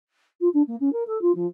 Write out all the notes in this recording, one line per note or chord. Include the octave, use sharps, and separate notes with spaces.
F4
D4
A#3
C#4
A#4
A4
F4
F3